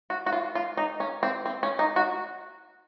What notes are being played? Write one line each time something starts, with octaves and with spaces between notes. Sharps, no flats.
F#4
F#4
F4
F4
D#4
C#4
C4
C4
C#4
D#4
F#4